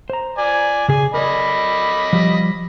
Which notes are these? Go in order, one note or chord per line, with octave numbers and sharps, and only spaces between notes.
C5 A#5
D5 G#5
C#3 G#4 G#5
A#4 D5 D#5 B5 D6
F3 G3